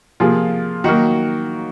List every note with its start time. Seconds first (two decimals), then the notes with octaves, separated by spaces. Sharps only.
0.20 C3 F3 A#3 F4 G#4
0.84 D#3 F#3 A#3 D#4 F#4